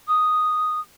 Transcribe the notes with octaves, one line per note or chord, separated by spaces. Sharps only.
D#6